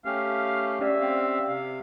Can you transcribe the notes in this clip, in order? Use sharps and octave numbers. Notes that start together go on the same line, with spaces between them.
A3 C#4 G4 F5
C#4 G4 D5 E5
C4 F5
C3 F5